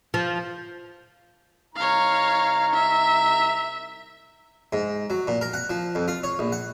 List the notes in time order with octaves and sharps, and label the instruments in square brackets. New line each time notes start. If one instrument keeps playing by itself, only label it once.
[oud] F3
[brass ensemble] C2 D#4 A#5 [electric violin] C#5 F5
[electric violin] E5
[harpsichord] G#2
F#3
A#2
A#4
F#5
F3
F2
F4
C#5
A#1
F#5